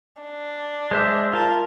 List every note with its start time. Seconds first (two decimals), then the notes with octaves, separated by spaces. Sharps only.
0.21 D4
0.91 G#3 C5 E5
1.33 F4 A#4 A5